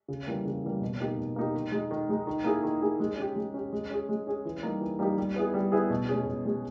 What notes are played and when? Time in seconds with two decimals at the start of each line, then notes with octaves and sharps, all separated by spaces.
0.08 C#3
0.27 E3 G3 A#3
0.45 C#3
0.64 E3 G3 A#3
0.81 B2
1.00 A#3 D#4 G4
1.18 B2
1.36 A#3 D#4 G4
1.55 D#3
1.72 G#3 D#4
1.91 D#3
2.09 G#3 D#4
2.27 D#3
2.44 A#3 E4 G#4
2.63 D#3
2.82 A#3 E4 G#4
3.00 G#3
3.18 C#4 G4
3.36 G#3
3.54 C#4 G4
3.73 G#3
3.90 C#4 G#4
4.09 G#3
4.27 C#4 G#4
4.45 E3
4.63 G3 A#3 D#4 G4
4.81 E3
4.99 G3 A#3 D#4 G4
5.18 G3
5.36 B3 E4 G#4
5.54 G3
5.72 B3 E4 G#4
5.90 B2
6.09 G#3 C#4 G#4
6.26 B2
6.45 G#3 C#4 G#4